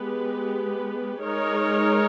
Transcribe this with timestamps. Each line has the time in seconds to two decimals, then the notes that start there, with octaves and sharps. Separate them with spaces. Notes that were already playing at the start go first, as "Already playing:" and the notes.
Already playing: G#3 B3 G4 B4
1.24 G#3 D#4 A#4 C#5